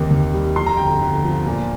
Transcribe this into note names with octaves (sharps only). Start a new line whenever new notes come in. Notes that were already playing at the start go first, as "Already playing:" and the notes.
Already playing: D#2 C3 D#3
D#2
G3
F2 C6
A#5
G1 G5
A#5
G1
F3
A#2